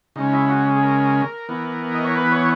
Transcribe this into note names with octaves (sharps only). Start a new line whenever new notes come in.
C#3 G#3 C#4 D#4
E4
F#4
G#4
A#4
E3 B3
D#5
C#5
B4
C#5